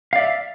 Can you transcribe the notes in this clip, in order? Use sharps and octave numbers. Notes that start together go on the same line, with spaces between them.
D5 E5 F5